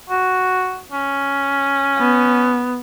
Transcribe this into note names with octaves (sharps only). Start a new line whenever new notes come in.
F#4
C#4
B3